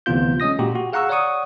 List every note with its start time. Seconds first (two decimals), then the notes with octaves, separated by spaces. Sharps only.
0.06 D2 C3 E3 B3 F4 G6
0.40 G#3 C#4 D#5 D#6 A#6
0.59 A#2 F#4 G4
0.75 F#4
0.93 G#4 F5 F#5 A#5 C#6 E6
1.09 C#5 D5 F#5 C#6 D#6